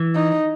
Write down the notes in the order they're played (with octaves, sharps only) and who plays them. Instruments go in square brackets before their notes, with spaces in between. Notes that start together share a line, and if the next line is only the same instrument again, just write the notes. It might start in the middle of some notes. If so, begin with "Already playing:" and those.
Already playing: [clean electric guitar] E3
[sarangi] D#4